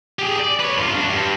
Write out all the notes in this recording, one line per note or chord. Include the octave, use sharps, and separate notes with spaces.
G4 G#4
D5
B4 C#5
G2 F4
D4 F#4
G2